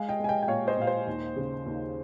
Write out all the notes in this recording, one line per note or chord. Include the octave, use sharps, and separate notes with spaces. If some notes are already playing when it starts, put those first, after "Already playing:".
Already playing: G#3 F5 G#5
D#5 G5
G#3 G#5
D#5 G5
G5
A#2 C#5 F5
C5 D#5
A#2 F5
C5 D#5
D#2
C#3
D#2